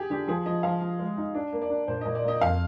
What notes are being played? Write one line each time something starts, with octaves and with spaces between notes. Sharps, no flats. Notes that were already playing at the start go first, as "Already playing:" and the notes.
Already playing: G4 G#4
D3 G4
F3 G#4
F3 D#5
F3 F5
F3
G#3
D#4
D4
A#3
D5
D4
A#2 C5
A#2 D#5
D5
A#3 D#5
F2 F5